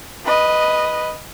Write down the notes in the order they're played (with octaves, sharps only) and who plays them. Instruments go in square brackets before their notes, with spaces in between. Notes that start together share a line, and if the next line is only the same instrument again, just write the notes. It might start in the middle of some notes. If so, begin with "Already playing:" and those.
[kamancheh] B4 D#5